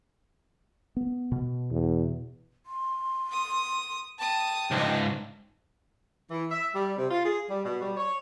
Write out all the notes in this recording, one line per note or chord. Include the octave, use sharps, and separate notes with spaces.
B3
B2
E2
C6
D#6
G5 A5 D#6
C#2 G#2 D4 D#5
E3
E5
G3
C3
F4
G#4
G3
B2
G3
C#5